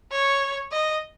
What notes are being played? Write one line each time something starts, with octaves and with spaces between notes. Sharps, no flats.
C#5
D#5